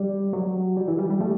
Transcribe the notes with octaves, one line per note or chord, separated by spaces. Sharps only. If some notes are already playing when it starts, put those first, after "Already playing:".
Already playing: G3
F#3
G3
E3
G3
G3
A3